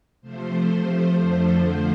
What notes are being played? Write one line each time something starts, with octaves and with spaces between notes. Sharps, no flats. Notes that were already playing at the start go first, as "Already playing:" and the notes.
C3 F3 A3 C5
F2 D3 F3 A3